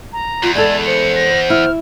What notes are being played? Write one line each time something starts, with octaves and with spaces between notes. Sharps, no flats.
A#5
E2 F4
G#3 A4 D5 G#6
C5 C#7
A#6
E4 F6